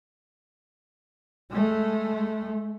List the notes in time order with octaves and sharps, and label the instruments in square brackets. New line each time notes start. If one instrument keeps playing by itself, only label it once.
[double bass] G#3 A3